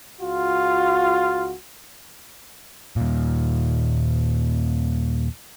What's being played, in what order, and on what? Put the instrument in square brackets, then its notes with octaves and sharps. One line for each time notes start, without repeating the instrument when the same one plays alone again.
[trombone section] C#2 F#4 [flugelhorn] F4
[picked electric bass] D#2 A#2